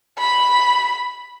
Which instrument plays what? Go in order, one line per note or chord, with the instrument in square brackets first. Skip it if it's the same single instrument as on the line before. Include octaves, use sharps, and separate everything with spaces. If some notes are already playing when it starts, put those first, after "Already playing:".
[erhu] B5